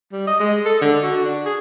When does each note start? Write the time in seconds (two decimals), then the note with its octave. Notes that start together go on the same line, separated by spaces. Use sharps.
0.12 G3
0.27 D#5
0.40 G#3
0.66 A4
0.82 D3
1.03 F#4
1.25 D4
1.45 G#4